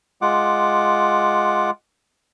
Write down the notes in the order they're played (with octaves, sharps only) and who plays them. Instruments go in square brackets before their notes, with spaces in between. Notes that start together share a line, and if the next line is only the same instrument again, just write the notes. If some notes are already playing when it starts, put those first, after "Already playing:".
[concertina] G#3 F4 F#5 D6